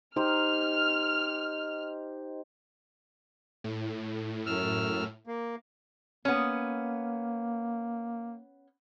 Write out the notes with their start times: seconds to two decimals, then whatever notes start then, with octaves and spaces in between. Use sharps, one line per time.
0.16 D#4 G4 C5 F6
3.64 A2
4.46 F#2 E6 F6
5.27 A#3
6.25 A#3 B3 C#4